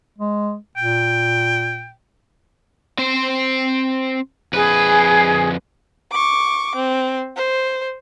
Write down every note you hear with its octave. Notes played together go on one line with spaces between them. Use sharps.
G#3
A#2 G5
C4 C5
F2 G#4 B4
C#6 D6
C4
C5